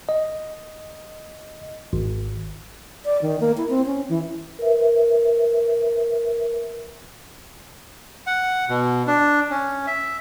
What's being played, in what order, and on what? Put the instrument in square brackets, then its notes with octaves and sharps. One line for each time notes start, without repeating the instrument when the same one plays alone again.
[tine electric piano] D#5
G#1
[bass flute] D5
D#3
A#3
E4
C4
C#4
E3
[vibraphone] A#4 B4 E5
[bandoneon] F#5
B2
D4
C#4
E5